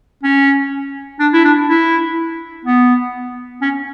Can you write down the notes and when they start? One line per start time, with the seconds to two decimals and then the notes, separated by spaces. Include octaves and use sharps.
0.23 C#4
1.20 D4
1.33 E4
1.45 D4
1.68 E4
2.65 B3
3.62 C#4